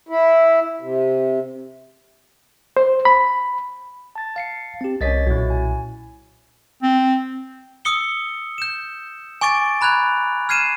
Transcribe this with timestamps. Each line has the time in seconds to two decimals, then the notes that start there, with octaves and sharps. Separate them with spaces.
0.09 E4
0.82 C3
2.77 C5
3.05 B5
4.15 A5 A6
4.36 F5 C7 C#7
4.81 C4 G4
5.01 C2 C#4 C#5 D#5 A6 B6
5.27 B1 A#2 E4 F#4
5.50 G#5
6.83 C4
7.85 D#6 E6 C#7 G7
8.58 G6 E7
9.41 G#5 C#6 D6 A6 D7
9.81 A#5 B5 F#6 G#6 F7
10.49 F6 G#6 C7 D#7 E7